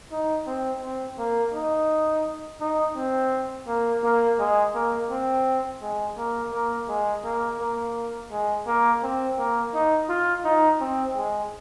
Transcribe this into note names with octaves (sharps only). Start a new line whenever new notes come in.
D#4
C4
C4
A#3
D#4
D#4
C4
A#3
A#3
G#3
A#3
C4
G#3
A#3
A#3
G#3
A#3
A#3
G#3
A#3
C4
A#3
D#4
F4
D#4
C4
G#3